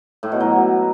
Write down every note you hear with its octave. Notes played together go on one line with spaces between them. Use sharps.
A2
B2
F#3